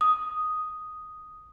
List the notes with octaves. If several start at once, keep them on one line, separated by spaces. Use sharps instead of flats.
D#6